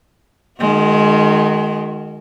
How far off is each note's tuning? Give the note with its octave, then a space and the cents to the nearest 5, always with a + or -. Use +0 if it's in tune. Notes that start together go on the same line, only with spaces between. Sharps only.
D#3 -25 G#3 +20 F#4 -15